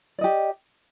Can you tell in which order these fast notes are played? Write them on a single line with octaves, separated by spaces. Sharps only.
D5 D#5 G4